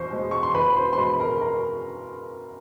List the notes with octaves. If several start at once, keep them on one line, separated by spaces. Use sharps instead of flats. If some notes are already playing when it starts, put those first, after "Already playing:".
Already playing: E2 B2 C5 C6 C#6
B2 G#3
C#6
C6
E2 B4 B5
C5 C6
C6
B2 G#3 B4 B5
A#4 A#5
A#4 A#5